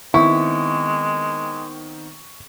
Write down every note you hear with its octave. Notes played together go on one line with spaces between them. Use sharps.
D#3 G#3 B3 C4 E4 C#6